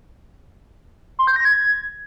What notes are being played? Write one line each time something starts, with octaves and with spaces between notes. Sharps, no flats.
C6
G6
A#6
G#6